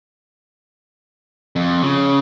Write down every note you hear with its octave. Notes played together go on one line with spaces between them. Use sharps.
F2
C#3